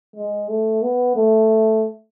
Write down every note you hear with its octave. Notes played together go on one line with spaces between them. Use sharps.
G#3
A3
B3
A3